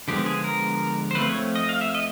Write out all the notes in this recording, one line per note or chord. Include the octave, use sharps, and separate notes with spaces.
D3 F3 G#3 B3 G4
G#4
A#4
C5
F3 A3 C4 B4
C#5
D#5
F5
E5
D#5